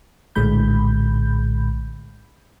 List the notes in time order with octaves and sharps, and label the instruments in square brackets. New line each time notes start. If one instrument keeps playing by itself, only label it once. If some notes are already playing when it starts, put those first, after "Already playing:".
[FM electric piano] A#1 A2 D3 G#3 B5 G6